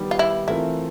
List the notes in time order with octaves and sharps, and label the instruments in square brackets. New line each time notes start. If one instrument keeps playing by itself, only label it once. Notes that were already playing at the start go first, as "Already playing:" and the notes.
Already playing: [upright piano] D#3 G3 B3
[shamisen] F4
E4
[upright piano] E3 A3 C4 F4 A#4 [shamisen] E4